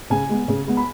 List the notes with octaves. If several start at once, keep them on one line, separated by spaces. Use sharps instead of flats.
C#3 G#5
G#3 B3
C#3
G#3 B3
B5